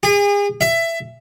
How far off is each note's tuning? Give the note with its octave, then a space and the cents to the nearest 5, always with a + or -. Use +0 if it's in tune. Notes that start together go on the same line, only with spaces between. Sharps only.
G#4 -40
E5 +15